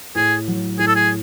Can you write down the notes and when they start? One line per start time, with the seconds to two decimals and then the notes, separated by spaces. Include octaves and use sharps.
0.15 A2 G#4
0.48 F#3
0.79 A2 G#4
0.87 A4
0.96 G#4